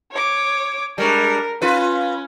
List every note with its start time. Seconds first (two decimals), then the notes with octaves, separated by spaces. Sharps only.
0.11 C#5 D6
0.98 G3 G#3 D4 A#4
1.62 C#4 F4 B4